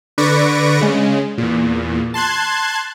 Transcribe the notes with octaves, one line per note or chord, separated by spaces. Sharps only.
D3 B4 D5 C#6 A#6 D7
C#3 G#3
E2 A#2
A5 C6 F#6 G#6